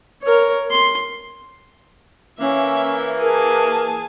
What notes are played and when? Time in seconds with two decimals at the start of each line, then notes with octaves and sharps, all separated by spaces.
0.23 A#4 C#5
0.71 C6
2.40 E3 A#3 C#4 E5
3.22 G#4 A#4 A5